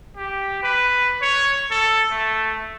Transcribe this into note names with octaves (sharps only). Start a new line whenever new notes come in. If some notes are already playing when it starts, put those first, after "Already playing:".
G4
B4
C#5
A4
A3